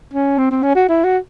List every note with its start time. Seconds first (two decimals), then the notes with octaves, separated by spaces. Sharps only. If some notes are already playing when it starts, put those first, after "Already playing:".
0.13 C#4
0.38 C4
0.51 C4
0.63 C#4
0.75 F#4
0.89 E4
1.04 F#4